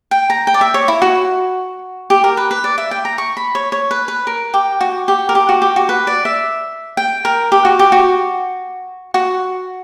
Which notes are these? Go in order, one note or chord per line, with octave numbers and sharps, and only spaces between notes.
G5
A#5
G5
D5
E5
C#5
E4
F#4
G4
A#4
B4
B4
D5
E5
G5
A#5
C#6
B5
C#5
C#5
B4
B4
A#4
G4
F#4
G4
A#4
G4
F#4
G4
F#4
B4
D5
E5
G5
A#4
G4
F#4
G4
F#4
F#4